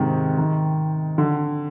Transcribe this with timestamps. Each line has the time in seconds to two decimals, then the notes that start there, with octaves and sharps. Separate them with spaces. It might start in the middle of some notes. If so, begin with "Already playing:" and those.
Already playing: G#2 C3 D#3
0.38 D#3
1.18 D3